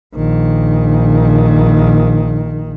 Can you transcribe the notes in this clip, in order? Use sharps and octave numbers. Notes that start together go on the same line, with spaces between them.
A#1 D#3